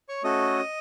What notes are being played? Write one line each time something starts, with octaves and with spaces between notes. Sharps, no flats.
C#5 C#6
A3 C#4 F#4 A4 D#5 D#6